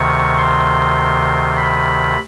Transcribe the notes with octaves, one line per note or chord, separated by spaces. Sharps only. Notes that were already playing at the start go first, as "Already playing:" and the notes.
Already playing: D2 C3 D#3 C#6
C6
B5